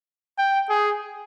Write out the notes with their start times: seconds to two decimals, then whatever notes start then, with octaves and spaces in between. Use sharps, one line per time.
0.38 G5
0.69 G#4